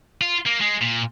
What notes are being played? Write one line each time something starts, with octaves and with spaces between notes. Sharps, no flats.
F4
A#3
G#3
A#2